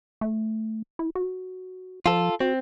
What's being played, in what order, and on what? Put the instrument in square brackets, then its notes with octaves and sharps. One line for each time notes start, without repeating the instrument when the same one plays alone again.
[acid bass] A3
E4
F#4
[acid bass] F3 [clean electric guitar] F4 A4
[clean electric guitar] C4 [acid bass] F#4